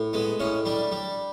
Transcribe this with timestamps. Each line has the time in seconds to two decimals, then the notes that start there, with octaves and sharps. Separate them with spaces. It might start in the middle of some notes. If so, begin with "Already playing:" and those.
Already playing: A2
0.13 G#3 B3
0.40 A2 C#4
0.65 G3 D4
0.92 G3